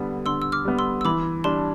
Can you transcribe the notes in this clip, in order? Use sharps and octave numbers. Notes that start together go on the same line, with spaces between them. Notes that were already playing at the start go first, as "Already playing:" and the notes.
Already playing: D3 G3 B3
D3 C6 E6
E6
D6 F6
G3 B3
C6 E6
E6
E3 B5 D6
G3 D4 A5 C6